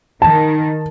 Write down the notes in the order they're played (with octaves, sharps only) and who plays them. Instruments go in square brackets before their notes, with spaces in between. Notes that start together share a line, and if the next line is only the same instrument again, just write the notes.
[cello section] D#3 [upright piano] A5